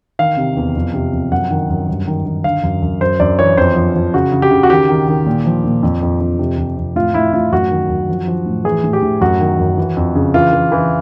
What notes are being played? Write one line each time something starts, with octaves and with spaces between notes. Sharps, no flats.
D#3 F5
C3
E2
F2
C3
F2
F#2 F#5
D#3
F#2
G2
D#3
D#3
D3 F5
F#2
F#2
F#2 C5
F#2 D5
E3 C#5
F2 C5
F3
F3
C#3 F#4
C#3
G4
C#3
F#4
D#3 G4
D#3
D#3
A#2
F3
A#2
F2
F2
F2
C3
F2
F2
A2 F4
A2 E4
A2 F4
F#2 F#4
D#3
F#2
F3
F3
A2
E3 G#4
A2
G4
A2
F#2 F#4
D#3
F#2
E3
F2
C#3
E3 F4
E3
E3